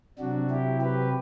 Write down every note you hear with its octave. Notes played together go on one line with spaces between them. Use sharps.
C3 F#3 D4 F#4
E4 G4
G4 B4